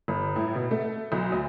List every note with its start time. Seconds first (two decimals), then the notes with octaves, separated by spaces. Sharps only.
0.08 G1
0.36 A2
0.55 B2
0.71 A3
1.12 B1
1.32 D2